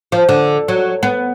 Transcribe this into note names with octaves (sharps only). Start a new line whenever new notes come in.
F3
D3
F#3
B3